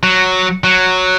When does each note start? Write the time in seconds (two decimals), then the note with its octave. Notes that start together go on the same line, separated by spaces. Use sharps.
0.03 F#3
0.64 F#3